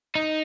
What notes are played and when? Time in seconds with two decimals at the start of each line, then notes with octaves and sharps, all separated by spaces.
0.15 D#4